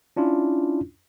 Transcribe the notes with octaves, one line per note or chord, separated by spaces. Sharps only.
C#4 D4 E4 F4